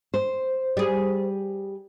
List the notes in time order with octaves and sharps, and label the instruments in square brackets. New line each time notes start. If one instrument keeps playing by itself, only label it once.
[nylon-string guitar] C5
[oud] G3 G#4